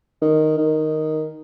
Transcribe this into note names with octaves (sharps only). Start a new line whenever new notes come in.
D#3
D#3